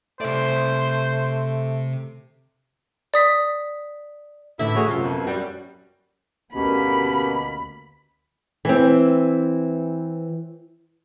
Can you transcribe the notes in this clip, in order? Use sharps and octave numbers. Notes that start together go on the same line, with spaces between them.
C3 A3 C5 D5
D5 D#6 B6
A2 D3 E3 E4 E5
A3 F#4 G#4 C#5
F#2 C3 F4
F2 B2
G3 F#4
D2 B2 A#3 C#4 G4 B5
E3 C4